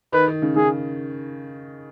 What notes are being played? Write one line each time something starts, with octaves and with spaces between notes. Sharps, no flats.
D#3 B4
D#3
C#3
C#3 G#4